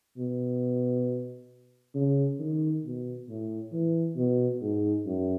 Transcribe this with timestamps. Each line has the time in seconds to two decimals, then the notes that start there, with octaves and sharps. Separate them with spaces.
0.18 B2
1.95 C#3
2.39 D#3
2.85 B2
3.29 A2
3.72 E3
4.17 B2
4.62 G#2
5.06 F#2